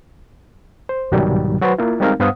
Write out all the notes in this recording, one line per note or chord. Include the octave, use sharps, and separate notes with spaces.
C5
C2 G#2 B2 D#3 F#3 G3
F#3 F#4 B4 C5
A#3 E4 F4
G3 G#3 C4 D#4 A#4 F5
G2 B3 C5 F5 F#5 D#6